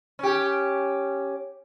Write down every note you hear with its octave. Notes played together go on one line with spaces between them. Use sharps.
C#4 G4